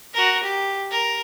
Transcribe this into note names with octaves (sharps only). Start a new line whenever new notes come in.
F#4 A#4
G4
A#4